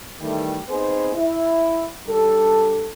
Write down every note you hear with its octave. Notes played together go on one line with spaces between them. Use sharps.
D#3 E3 G3 A3
B3 C4 D#4 G#4 C5
E4
G3 D4 A4